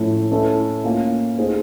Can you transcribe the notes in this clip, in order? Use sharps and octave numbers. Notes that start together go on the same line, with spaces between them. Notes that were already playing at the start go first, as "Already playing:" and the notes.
Already playing: A2 F3 A3 C#4
A3 C#4 E4 A4
A#3 C#4 F4
A3 C4 D#4 G#4 C5